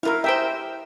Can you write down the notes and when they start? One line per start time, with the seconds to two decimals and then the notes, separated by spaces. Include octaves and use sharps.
0.03 F#3 E4 F4 A#4 F5
0.24 G4 G#4 C5 E5 G5 A#5